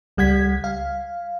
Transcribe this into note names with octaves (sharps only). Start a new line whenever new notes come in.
C#2 G3 F#5 G#6 B6
F5